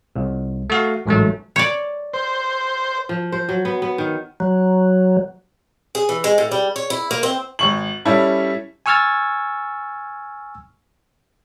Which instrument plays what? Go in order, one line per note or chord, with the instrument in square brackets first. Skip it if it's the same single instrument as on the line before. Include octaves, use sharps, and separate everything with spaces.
[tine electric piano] C2
A3 F#4 F5
A1 G#2 F#3 A3
[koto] C#5 D5
[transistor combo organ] C5
[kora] F3
C5
F#3
B3
B3
D#3
[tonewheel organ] F#3
[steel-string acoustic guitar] G#4
E3
G#3
A2
G3
C#5
E4
A#3
C4
[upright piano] G#1 C#6 F#7
G3 C#4 E4 A4
[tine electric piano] G#5 C#6 E6 F6 G#6 A6